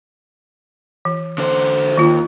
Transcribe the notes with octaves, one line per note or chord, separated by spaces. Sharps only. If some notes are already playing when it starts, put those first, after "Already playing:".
E3
D3 C5
D#2 D#3 F4